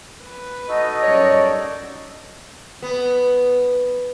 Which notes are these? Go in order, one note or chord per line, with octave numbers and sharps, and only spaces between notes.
B4
D#4 F#4 A4 D#5
F#2 G3 C#5 D5
B3